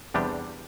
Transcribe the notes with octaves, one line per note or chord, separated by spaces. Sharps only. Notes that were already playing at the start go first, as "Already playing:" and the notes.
E2 C3 G3 D4 G4